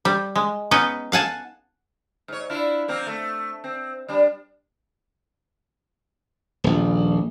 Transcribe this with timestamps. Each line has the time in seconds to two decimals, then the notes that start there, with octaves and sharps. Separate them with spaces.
0.05 G3
0.35 G#3
0.71 B3 C#4 D#4 B4 D#5
1.12 F5 F#5 G#5 A5
2.28 G#2 C#5
2.50 D4 E4 F4
2.88 F3 A#3 C4
3.07 A3
3.64 C4
4.09 G3 D4
6.64 D#1 A#1